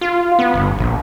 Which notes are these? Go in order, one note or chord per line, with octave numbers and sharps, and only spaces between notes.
F4
B3
G1
A#1